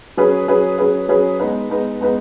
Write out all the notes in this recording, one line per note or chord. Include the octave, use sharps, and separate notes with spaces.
F#3 C#4 G#4 B4
F#3 C#4 G#4 B4
F#3 C#4 G#4 B4
F#3 C#4 G#4 B4
G#3 B3 D#4 B4
G#3 B3 D#4 B4
G#3 B3 D#4 B4